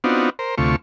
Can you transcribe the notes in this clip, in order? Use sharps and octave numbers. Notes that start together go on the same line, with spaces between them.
B3 C4 D4 D#4 F4 F#4
A#4 C5
D2 C3 A3 F4 C#6